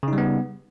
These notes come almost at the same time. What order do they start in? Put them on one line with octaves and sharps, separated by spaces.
C#3 D#4 G3 B3